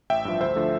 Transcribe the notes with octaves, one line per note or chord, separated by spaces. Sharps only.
A1 E5 G5
G2 F3
D2 C5 E5
D3 F3 A3